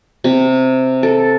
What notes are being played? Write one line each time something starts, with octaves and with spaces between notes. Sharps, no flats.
C3
A4